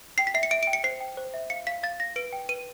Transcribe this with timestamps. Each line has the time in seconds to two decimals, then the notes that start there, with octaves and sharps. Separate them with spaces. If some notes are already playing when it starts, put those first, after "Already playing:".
0.18 G5 C7
0.27 B6
0.34 E5 C7
0.43 C#7
0.51 E5 D7
0.63 D7
0.67 G5
0.73 C#7
0.84 C5 C7
1.00 G5
1.17 C5
1.34 E5
1.50 F5 C#7
1.67 F5 B6
1.83 F5 A6
2.00 F5 A#6
2.16 B4 D7
2.33 G5
2.49 B4 D#7